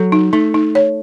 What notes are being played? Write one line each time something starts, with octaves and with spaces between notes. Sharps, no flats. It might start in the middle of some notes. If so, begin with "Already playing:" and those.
Already playing: F#3 A4
D#4
A3 D#4
D#4
C#5